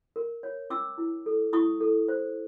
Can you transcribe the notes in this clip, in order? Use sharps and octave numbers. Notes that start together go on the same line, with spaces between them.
A#4
C#5
C#4 D6 E6
E4
A4
E4 C#6 D#6
A4
C5